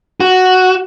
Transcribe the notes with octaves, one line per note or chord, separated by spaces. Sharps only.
F#4